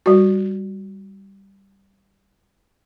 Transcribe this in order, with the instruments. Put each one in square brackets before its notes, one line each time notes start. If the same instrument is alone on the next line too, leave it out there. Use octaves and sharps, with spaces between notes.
[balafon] G3 F#4